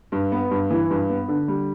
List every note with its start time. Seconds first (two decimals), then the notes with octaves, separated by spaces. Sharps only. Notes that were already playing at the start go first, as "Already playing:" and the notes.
0.12 G2
0.32 B3
0.51 G2
0.70 E3
0.90 G2
1.10 B3
1.29 D3
1.48 G3